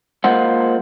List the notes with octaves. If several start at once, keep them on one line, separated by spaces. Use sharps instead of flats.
G#3 A#3 F4 C5 F#5